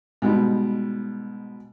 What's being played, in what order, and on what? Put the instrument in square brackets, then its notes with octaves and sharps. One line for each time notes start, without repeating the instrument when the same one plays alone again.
[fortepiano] G#2 B2 G3